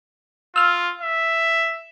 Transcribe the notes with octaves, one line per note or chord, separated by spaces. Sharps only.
F4 E6 F6
E5